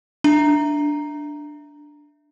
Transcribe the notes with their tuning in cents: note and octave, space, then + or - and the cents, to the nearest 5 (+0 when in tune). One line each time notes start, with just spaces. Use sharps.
D4 +0 E5 +0 A#5 +0